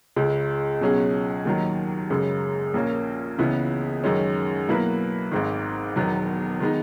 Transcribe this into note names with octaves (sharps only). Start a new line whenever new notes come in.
C#2 C#3 G#3
C#2 B2 F#3 C#4 G#4
D#2 D#3 F#3
F#2 C#3 G#3
A#1 A#2 A#3 C#4
C#2 C#3 E3 B3 E4
F#2 D#3 G#3 C#4
B2 F#3 A#3 E4 B4
G#1 G#2 D#3
E1 E2 D#3 F#3 B3
D#3 G#3 B3 D#4